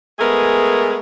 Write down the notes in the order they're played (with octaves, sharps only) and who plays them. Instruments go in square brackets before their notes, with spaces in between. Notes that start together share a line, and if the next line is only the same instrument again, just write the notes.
[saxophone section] G#3 A3 B3 G#4 A#4